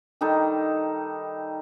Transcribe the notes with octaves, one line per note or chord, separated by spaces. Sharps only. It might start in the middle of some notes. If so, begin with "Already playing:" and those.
D#3 G3 D#4 A4